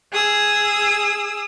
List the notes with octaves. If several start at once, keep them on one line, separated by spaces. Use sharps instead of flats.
G#4 D#6 E6